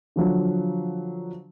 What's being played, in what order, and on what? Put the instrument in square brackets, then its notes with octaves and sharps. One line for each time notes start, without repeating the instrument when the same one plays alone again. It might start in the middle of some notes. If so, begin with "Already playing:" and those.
[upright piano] D3 F3 F#3